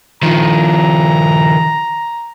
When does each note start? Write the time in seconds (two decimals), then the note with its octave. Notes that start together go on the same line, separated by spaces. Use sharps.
0.23 D#3 F3 A#5